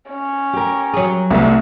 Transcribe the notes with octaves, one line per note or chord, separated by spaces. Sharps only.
C#4
G4 A#4
F#3 G#4
C2 A3 B3